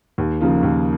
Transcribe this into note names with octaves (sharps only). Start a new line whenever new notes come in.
D#2
C#3 F3 A#3 F4
D#2